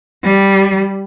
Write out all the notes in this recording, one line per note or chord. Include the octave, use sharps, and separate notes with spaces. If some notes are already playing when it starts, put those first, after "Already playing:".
G3